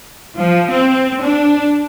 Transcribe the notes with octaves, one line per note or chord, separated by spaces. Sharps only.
F3
C4
D4